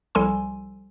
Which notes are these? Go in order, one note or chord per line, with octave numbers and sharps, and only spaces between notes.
C2 F3 G3 A4 G#5 C6